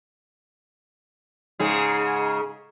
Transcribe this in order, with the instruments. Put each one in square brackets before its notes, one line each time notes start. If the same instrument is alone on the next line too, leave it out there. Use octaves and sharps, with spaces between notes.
[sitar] G#2 C#3 G#4